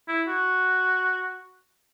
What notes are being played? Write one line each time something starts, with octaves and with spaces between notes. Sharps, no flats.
E4
F#4